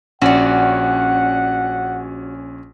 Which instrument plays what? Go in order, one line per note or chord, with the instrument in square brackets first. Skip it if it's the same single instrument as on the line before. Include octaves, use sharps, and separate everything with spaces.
[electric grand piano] A#1 C#4 [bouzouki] F#4 D5 [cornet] F#5